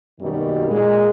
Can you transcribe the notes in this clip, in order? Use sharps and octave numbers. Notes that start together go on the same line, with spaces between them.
F#2 B2 D#3 G3 A#3 D#4
A#2 G#3